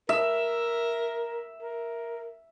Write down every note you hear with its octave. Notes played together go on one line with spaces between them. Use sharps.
A#4 E5
A#4